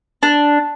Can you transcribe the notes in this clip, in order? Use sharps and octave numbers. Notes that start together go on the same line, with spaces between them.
D4